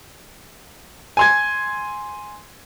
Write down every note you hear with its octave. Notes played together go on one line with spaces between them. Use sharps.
G#5 C6 G#6